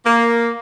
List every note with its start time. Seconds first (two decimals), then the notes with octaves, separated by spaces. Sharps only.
0.06 A#3